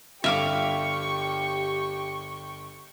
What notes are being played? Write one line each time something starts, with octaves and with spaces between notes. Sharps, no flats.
G1 G4 E5 F5 G5 C#6 D6 D7